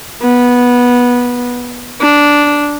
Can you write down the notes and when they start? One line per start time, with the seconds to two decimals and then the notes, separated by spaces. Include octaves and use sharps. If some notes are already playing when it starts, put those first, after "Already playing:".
0.23 B3
2.01 D4